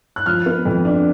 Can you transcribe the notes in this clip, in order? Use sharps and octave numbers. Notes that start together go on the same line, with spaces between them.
F#6
F3 F6
B3
F2
D4